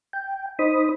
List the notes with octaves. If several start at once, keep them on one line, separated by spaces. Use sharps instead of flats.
G5
D#4 C5 B5 D#6